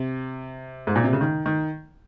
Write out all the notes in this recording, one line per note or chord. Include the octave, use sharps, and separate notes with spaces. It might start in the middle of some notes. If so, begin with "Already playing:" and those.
Already playing: C3
G#2
A#2
C3
C#3
D#3
D#3